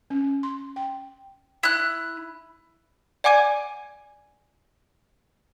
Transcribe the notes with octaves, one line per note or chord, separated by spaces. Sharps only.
C#4
C6
G5
E4 F#6
D5 F#5 G#5 D6 G#6 D#7